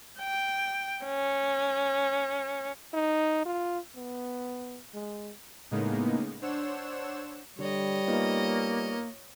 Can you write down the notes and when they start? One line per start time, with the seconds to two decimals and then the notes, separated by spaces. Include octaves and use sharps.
0.20 G5
1.05 C#4
2.93 D#4
3.45 F4
3.96 B3
4.94 G#3
5.71 A2 C#3 G#3 A#3 B3 D#4
6.42 D4 C5 C#5 F#5 E6 E7
7.59 D3 G3 C#5 D#5
8.07 A#3 B3 D#4 F4